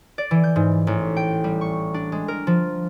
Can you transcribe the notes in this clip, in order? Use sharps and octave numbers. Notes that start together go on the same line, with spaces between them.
D5
E3
G6
G#2
A1
G5
G3
C#6
D4
G#3
A#4
F3